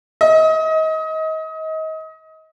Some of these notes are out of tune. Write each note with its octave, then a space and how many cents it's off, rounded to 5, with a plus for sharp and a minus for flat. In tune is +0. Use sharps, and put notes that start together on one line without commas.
D#5 +30